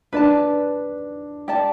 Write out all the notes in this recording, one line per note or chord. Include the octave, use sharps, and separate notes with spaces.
D4 B4 D5 A5
G4 D5 A5